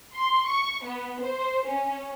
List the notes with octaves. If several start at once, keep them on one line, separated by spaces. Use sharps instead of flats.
C6
C#6
B3
C5
C#4